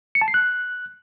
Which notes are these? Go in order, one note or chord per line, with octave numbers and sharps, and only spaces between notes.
C#7
A5
C7
F#6